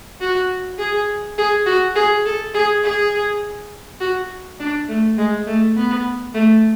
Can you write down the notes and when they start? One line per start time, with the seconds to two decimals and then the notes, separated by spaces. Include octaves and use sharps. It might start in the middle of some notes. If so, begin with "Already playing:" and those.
0.21 F#4
0.78 G#4
1.38 G#4
1.66 F#4
1.95 G#4
2.25 A4
2.54 G#4
2.83 G#4
4.00 F#4
4.60 D4
4.88 A3
5.18 G#3
5.47 A3
5.76 B3
6.34 A3